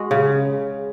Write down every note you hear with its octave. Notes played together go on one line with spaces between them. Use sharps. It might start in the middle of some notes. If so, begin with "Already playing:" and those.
Already playing: G#3 F#4
C#3